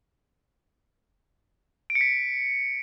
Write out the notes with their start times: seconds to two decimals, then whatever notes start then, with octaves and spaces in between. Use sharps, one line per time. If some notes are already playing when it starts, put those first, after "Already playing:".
1.90 D7
1.95 C#7
2.01 B6